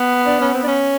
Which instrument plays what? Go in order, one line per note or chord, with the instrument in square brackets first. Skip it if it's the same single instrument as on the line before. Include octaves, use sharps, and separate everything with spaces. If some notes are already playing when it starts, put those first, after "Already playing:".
Already playing: [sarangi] B3
[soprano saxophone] D4
C#4
C4
D4
C#4